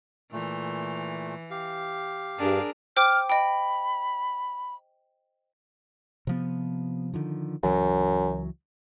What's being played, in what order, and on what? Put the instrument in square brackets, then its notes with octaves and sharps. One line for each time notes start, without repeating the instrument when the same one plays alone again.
[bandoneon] A#2 A3 [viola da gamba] E3
[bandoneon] G4 F5
[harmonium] G2 [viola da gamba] D4 G#4 A#4
[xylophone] C5 G5 D6 [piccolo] F6
[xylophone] D#5 G5 [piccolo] B5
[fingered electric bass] C3 F3 B3
D3 D#3 F3
[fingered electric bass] C#2 E3 F#3 [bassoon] F#2